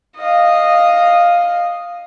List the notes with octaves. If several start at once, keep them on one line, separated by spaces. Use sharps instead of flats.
D#5 F5